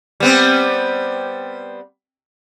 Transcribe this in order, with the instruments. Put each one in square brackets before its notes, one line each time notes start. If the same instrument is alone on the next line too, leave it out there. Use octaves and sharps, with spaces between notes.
[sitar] G3 B3 C4